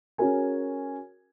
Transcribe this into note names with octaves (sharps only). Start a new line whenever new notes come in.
C#4 F#4 G#4 A#4 G#5